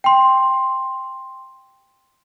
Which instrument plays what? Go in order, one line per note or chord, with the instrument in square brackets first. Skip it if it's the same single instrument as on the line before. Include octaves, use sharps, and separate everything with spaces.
[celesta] G5 C6